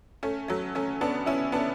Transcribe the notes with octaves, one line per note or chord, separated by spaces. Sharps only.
A3 C#4
F#3 A3
A3 C#4
B3 D4
C#4 E4
B3 D4